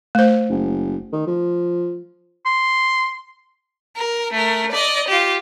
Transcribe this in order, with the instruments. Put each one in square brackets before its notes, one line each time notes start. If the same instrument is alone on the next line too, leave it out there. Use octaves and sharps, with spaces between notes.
[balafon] A3 C5
[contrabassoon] F#1
D#3
F3
[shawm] C6
[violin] A#4
A3 A#4
D5 D#5
F4 G4